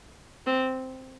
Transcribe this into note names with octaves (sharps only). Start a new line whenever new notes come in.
C4